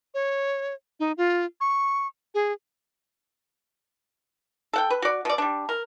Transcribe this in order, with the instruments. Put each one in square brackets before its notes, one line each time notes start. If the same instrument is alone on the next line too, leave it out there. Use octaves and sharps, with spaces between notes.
[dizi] C#5
D#4
F4
C#6
G#4
[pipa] A4 F#5 G5
B4
F#4 D5
B2 D5
G3 D4
A#4